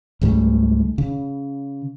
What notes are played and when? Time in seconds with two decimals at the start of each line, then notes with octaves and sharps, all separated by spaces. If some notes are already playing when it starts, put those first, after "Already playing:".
0.21 C#2 G#2 G3 A3
0.98 C#3